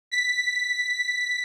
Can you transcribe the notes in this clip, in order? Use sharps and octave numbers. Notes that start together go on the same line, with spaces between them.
B6